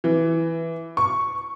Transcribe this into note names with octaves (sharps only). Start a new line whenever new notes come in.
E3
C#6